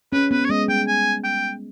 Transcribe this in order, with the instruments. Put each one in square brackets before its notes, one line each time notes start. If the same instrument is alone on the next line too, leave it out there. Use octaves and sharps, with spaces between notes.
[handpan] C#4 [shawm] B4
[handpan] B3 [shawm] B4
[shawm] C#5
[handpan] G#3 [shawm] D#5
[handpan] G3 [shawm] G5
[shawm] G#5
G5